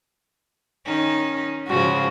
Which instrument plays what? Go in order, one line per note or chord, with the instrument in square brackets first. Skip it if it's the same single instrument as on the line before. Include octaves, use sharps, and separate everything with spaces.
[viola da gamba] D#3 C#4 D#4
[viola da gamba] G#2 C#3 F3 [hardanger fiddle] F#4